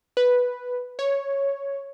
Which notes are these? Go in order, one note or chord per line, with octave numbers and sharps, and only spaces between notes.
B4
C#5